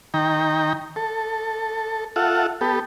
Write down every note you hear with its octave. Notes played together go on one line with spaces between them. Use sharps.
D#3 G5 A#5
A4
F4 A4 E5 F#5
B3 G4 A4